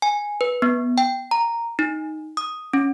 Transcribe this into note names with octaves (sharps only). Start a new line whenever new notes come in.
G#5
B4
B3
G5
A#5
D#4
D#6
C#4